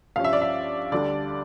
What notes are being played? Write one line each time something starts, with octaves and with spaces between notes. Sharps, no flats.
G2 F3 C#4 F5
E5
D5
E5
D2 D3 G3 D4 D5